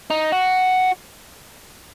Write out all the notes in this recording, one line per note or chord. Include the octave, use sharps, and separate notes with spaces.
D#4
F#4